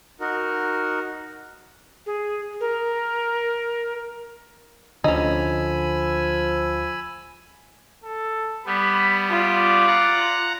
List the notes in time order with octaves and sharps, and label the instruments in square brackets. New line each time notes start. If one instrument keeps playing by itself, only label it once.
[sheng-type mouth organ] D#4 F#4 A#4
[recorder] G#4
A#4
[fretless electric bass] D2 D3 [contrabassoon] F3 [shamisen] C#4 D#4 [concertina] G#5 B5 E6
[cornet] A4
[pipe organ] G3 B3 [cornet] B5
[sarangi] F4 [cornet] D5
[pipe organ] F#5 A#5 F#6